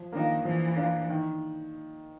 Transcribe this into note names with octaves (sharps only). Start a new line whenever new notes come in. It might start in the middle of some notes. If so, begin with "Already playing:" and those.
Already playing: F3
D#3 A#3 D4 F4
E3 F3
A#3 D4 F4
D#3